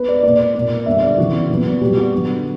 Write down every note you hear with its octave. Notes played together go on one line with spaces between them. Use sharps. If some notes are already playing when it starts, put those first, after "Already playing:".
Already playing: B3 B4
D5
A#2 A#3 D5
A#2 A#3
D3 G3 B3 E5
D5
C#3 E3 B3 F#4
A#2 F#3 B3
A#2 G3 B3 G4
F#4
D3 F#3 B3